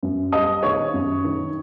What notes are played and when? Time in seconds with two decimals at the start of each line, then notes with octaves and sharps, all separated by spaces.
0.03 F#2
0.32 G3 D#5 D#6
0.63 D#3 C#5 C#6
0.94 F#2
1.24 D#3